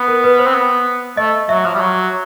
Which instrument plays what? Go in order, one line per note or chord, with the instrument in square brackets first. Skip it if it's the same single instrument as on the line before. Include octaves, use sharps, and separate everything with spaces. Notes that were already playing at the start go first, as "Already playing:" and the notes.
Already playing: [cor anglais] B3
[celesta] A#4
B4
C5
[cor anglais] C4
B3
[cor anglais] A3 [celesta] D#5
[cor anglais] F#3 [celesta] E5
[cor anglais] F3 [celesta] E5
[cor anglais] G3
F#3